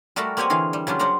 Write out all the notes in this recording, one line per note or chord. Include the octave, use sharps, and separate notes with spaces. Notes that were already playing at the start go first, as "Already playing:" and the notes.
G3 A3 F#4 A#4 A5 B5
A#3 C4 G4 C#5 F#5 G#5
D3 E3 G#4 F5
G3
C#3 F#3 G3 D4 F4
F#3 D4 C5 F#5 A#5